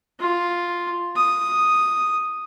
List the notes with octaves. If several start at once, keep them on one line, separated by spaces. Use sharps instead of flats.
F4
D#6